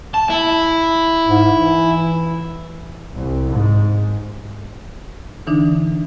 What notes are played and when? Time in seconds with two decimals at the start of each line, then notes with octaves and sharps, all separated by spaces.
0.14 A5
0.30 E4
1.28 G#2
1.53 E3
3.15 C2
3.50 G#2
5.47 D3 E3 D4 D#4